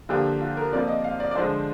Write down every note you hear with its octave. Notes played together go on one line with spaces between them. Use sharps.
D3 F3 A#3 D4 G4
F4
A#4
C3 F3 A#3 D5
D#5
F5
D5
D5
D3 F3 G#3 D4 C5